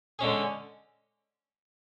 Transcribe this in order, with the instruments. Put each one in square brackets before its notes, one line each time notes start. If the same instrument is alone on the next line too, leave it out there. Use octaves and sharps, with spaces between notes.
[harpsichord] D3 G#3 C#4 G#4